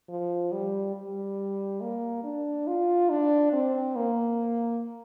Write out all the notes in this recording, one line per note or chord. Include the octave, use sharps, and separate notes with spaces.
F3
G3
G3
A#3
D4
F4
D4
C4
A#3